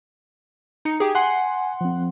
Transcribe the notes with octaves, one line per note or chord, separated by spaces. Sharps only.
D#4 C#7
G4 G#4
F#5 G#5 C6
F3 C4